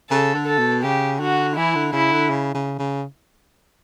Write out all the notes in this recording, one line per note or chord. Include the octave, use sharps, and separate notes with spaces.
C#3 A4
D3
A4
B2
C#3 G4
D3 F#4
E3 E4
D3
C#3 E4
D3
C#3
C#3
C#3